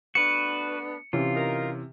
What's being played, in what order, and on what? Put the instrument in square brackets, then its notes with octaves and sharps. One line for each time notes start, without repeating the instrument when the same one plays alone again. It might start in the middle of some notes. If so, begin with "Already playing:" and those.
[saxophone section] A3 B3 D4 [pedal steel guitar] F#4 B4 [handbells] C#7
[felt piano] C3 E3 C#4 [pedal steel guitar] F4
[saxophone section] D#4 A#4